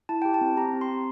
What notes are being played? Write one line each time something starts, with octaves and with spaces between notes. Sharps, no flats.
E4 A5
G4 G5
A5
C4
G4 A#5
C4
C6
C4